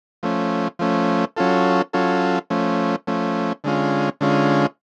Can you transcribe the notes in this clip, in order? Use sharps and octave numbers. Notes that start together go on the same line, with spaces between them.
F3 A3 C#4
F3 A3 C#4
F#3 C#4 F4 A4
F#3 C#4 F4 A4
F3 A3 C#4
F3 A3 C#4
D3 G#3 C#4 F4
D3 G#3 C#4 F4